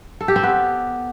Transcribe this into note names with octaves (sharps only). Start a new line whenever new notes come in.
A4
G4
C4
B3